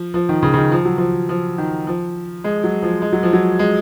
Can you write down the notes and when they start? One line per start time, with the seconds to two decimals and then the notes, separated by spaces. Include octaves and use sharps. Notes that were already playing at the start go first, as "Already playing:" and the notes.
Already playing: F3
0.14 F3
0.29 D#3
0.43 C#3
0.54 C#3
0.58 D#3
0.72 F3
0.85 F#3
0.98 F3
1.29 F3
1.58 D#3
1.87 F3
2.44 G#3
2.64 F#3
2.83 F3
3.02 G#3
3.13 F#3
3.23 F3
3.33 F#3
3.59 G#3